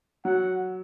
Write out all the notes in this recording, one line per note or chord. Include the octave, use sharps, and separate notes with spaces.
F#3 F#5